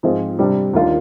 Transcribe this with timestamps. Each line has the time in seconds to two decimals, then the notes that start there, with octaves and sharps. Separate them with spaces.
0.03 G#2 F3 C4 F4 G#4
0.39 C3 G3 D4 G4
0.74 D#2 D#3 A#3 D4 F4